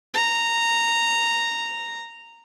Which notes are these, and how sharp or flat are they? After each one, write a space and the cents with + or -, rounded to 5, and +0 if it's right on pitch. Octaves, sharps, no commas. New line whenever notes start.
A#5 -10